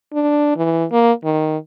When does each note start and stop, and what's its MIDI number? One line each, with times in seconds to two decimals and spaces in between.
0.13 0.56 62
0.56 0.85 52
0.92 1.12 58
1.24 1.57 51